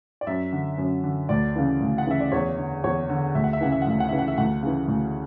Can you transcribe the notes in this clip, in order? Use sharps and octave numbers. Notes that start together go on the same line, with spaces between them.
D5
F#2 E5
D3
F#2
D3
D2 D5
C#3 E3
D2
F#5
C#3 E3 E5
D5
E2 C#5
D3
E2 C#5
D3
D2 E5
F#5
E5
C#3 E3 F#5
E5
F#5
D2 E5
F#5
C#3 E3 E5
F#5
E5
D2 F#5
C#3 E3
D2